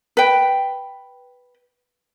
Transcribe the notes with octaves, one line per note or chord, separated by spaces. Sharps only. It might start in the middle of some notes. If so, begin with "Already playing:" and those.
B4 G5